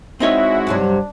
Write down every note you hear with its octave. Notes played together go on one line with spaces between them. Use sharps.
G#3 C4 D#4 E4 F#4 C#5 E5
G2 C3 F#3 D4